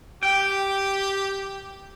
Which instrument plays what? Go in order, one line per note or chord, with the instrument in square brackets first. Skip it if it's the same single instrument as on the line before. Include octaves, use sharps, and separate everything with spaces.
[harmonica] G4 [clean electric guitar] G5